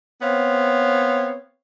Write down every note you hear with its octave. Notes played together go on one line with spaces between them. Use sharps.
B3 C4 C#5 F5